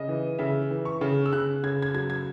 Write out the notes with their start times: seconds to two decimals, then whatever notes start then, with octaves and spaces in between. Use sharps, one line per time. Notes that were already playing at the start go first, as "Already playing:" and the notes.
Already playing: C#3 D#5
0.08 E3
0.39 C#3 E5
0.71 E3
0.85 C#6
1.01 C#3
1.26 E6
1.32 C#3 F#6
1.63 C#3 G#6
1.82 G#6
1.95 F#3 G#6
2.10 G#6